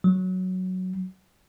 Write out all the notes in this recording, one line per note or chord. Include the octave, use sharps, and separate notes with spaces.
F#3